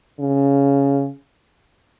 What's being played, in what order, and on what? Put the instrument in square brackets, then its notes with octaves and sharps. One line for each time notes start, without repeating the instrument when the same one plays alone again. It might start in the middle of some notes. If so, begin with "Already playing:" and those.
[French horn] C#3